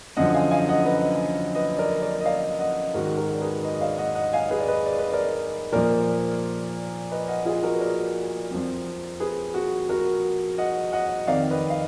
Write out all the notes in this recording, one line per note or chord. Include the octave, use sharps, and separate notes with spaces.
F#2 D3 F3 D#5 F#5
F5 G#5
F5 G#5
D#5 F#5
B4 D#5
B4 D#5
A#4 D5
A#4 D5
D#5
D5 F5
D#5 F#5
G#2 D#3 F#4 A#4
F#4 A#4
D5
G#4 B4
B4 D#5
D#5
D5 F5
D#5 F#5
D#5 F#5
F5 G#5
G#4 B4
D5
B4 D#5
D5
B4
A#4 D5
A#2 F3 A#4 D5
B4 D#5
D#5 F#5
F4 G#4
F#4 A#4
B4
A#4 D5
F2 F3
G#4 B4
F#4
F#4 A#4
D#5 F#5
D#5 F#5
F2 D#3 D5 F5
B4 D#5
F5